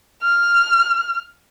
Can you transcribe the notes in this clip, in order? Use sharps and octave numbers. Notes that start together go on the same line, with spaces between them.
F6